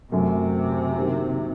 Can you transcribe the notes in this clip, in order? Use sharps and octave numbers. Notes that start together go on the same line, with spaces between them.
F#2 C3 F#3 A3
D#3 F#3 A#3 D4 G4